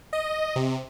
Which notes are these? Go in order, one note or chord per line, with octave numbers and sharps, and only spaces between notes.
D#5
C3